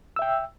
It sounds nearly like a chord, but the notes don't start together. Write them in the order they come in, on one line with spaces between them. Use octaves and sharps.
E6 E5 G5